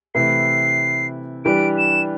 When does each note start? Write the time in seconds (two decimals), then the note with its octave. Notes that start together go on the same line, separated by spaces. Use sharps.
0.15 C3 E3 A3 E4 B4 C7
1.45 E3 G3 D4 G4 B4 D7
1.78 E7